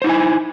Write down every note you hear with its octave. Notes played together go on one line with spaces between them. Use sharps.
D#4 E4 C5 G#5